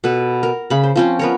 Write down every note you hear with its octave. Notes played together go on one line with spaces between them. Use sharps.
B2 A4 B4
A#4
C#3 B5
C5
F3 C4 C#4
B3 A#4 C#5